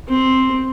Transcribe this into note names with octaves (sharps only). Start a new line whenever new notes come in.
C4